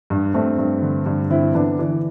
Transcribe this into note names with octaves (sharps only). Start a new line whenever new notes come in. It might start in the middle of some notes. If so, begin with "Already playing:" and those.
G2
G2 A3 C4
G2
D3
G2
D3 C4 E4
D3 B3 D4
E3